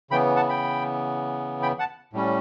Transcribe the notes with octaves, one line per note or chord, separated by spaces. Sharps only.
C#3 E3 B3 G5 B5
F#5 A5
G5 B5
G5 B5
F#5 A5
A2 G3 C#4